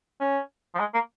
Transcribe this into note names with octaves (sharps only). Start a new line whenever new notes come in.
C#4
F3
G#3
A#3